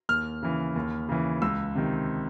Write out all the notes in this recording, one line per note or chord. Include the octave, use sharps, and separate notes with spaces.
D#2 F6
C#3 E3
D#2
C#3 E3
C#2 E6
C3 D#3